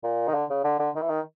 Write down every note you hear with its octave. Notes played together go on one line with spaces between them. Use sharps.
A#2
D#3
D3
C#3
D3
D3
D#3
E3
D#3